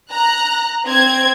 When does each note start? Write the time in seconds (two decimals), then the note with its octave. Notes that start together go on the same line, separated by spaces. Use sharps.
0.11 A#5 F#6
0.86 C4 G#6